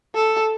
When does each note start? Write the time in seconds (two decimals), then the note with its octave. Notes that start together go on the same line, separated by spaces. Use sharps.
0.15 A4